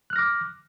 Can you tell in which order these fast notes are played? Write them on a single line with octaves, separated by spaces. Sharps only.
F#6 F6 A#6 D6